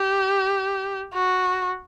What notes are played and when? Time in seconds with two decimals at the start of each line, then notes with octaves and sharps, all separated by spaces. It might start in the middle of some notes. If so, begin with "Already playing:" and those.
Already playing: G4
1.13 F#4